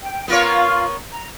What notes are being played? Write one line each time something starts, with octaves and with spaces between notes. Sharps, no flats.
G5
B3 F4 A#4 C#5
A#5